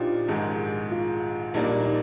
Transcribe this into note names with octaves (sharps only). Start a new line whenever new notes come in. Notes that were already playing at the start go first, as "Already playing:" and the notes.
Already playing: A#2 F3 D4 D#4 F4 G4
A#1 G#2 D#3 G#3 G#4
F4
A#1 A#2 G3 A#3 D4 D#4
D#4
D#4